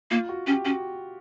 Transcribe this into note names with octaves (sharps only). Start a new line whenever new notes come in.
A#3 F4
F#4
C#4 G4
C#4 F#4